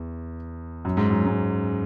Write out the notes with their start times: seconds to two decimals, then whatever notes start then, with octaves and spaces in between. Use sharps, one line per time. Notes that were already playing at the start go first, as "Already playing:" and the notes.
Already playing: E2
0.85 F#2
0.97 G#2
1.10 F#2
1.26 G#2